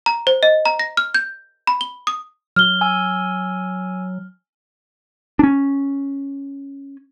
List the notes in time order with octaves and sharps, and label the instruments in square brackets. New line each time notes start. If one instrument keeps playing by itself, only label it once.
[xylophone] A#5
C5
D#5
A#5
A#6
F6
G6
B5
G7
D#6
[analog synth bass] F#3 [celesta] F6 G7
[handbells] G#5 E6
[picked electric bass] C#4 D4